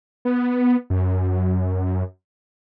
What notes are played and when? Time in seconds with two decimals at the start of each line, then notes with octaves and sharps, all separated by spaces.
0.25 B3
0.90 F#2